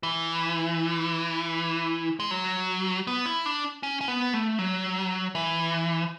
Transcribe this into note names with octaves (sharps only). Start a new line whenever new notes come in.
E3
G#3
F#3
B3
E4
D4
C#4
C#4
B3
A3
F#3
E3